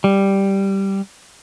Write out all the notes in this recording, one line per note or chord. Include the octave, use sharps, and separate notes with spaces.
G3